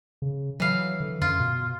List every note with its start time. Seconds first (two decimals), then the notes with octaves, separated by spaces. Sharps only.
0.22 C#3
0.60 E3 F#3 F5
1.00 D3
1.22 F#2 F4
1.40 B2